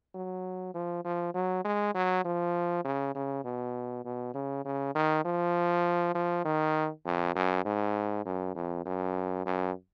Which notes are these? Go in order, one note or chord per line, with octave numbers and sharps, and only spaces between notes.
F#3
F3
F3
F#3
G#3
F#3
F3
C#3
C#3
B2
B2
C#3
C#3
D#3
F3
F3
D#3
F2
F#2
G#2
F#2
F2
F#2
F#2